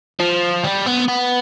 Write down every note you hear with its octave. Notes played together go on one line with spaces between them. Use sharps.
F3
G3
B3
B3